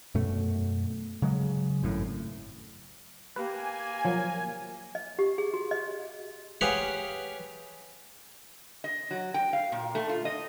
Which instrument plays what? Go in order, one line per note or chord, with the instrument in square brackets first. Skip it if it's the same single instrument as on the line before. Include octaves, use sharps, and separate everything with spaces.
[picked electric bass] F#2 B2 A3
C#3 F#3 G#3
G#1 F#2 A2
[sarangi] A#3 [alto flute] G4 [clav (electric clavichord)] B4 [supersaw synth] G#5
[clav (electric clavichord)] F3 F#3 [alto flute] A#4
[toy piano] D#5
G4
G#4
F#4
D#5
[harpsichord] G4 G#4 B4 C#5 F5 F#5
[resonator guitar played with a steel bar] D#5
F#3
G5
F5
A#2
A3
F4
D#5